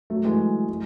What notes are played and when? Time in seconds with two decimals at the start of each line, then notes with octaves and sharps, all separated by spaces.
0.10 F#3 A3
0.25 E3 G#3
0.69 E3 G#3